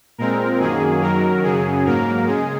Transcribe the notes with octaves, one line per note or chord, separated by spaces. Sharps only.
A#2 G#3 C4 A#4
F#2 D#3 F#3 A#3 G#4
F#2 D#3 F#3 A#4
F#2 C#3 F#3 G#4
G#2 F#3 A#3 A#4
C#3 G#3 G#4